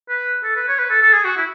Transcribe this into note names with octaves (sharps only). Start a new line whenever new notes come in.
B4
A4
B4
C#5
B4
A4
A4
G#4
F#4
E4